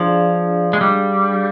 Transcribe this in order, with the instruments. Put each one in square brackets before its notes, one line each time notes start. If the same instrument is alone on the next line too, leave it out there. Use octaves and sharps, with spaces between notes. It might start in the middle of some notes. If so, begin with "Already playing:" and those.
Already playing: [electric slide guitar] F3 [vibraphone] D4 G#4 D5 F5
[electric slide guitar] G#3
G3